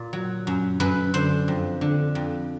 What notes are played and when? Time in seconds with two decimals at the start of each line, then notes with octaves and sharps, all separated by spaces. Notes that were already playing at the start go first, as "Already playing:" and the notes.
Already playing: A#2
0.13 F#3
0.47 F#2
0.80 F#2 B4
1.14 D3 C5
1.48 F2
1.81 D3
2.15 F2